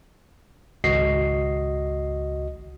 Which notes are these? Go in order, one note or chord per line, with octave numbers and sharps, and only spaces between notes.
G#1 C#2 F#4 D#5 C7